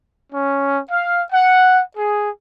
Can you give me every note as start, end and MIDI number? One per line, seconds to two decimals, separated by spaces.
0.32 0.80 61
0.90 1.22 77
1.33 1.81 78
1.97 2.30 68